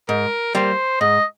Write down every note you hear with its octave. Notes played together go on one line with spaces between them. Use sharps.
G#2 A#4
G3 A#3 C5
G#2 D#5